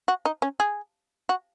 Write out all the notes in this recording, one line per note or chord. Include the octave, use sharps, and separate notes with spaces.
F#4
D#4
C#4
G#4
F#4